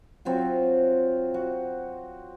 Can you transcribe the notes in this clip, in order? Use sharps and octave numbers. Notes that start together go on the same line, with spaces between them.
F#3 C4 F4 F#4
F#4